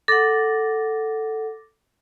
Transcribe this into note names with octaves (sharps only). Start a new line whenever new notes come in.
A4 F#5 D6 A6 A#6